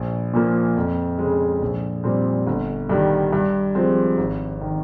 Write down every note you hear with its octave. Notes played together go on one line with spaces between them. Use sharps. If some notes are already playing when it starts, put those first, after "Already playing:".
Already playing: A#1
A#2 F3 A#3
F2
C#3 G#3
A#1
A#2 G3 C4
G1
G2 D#3 G3
G2
F3 G#3 C4
G#1
D#3